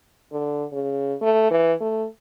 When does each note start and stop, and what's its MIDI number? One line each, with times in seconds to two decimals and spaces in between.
0.32 0.65 50
0.72 1.14 49
1.21 1.49 57
1.50 1.73 52
1.80 2.06 57